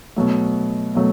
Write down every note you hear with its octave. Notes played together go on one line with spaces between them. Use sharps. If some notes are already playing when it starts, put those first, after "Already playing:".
B2 F#3 A3
B2 F#3 A3